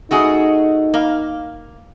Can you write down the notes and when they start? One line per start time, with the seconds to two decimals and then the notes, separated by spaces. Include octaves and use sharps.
0.11 A3 D#4 F#4 G#4
0.94 A#3 F5